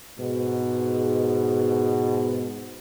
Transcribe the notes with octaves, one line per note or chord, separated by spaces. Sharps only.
G#2 B2